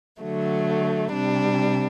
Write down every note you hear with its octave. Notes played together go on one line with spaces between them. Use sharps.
D3 F#3 A3
C3 G3 D4